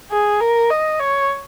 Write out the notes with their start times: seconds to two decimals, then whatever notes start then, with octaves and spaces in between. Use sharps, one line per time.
0.11 G#4
0.40 A#4
0.70 D#5
0.99 C#5